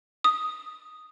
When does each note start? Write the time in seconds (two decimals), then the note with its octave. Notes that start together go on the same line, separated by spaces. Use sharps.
0.24 D#6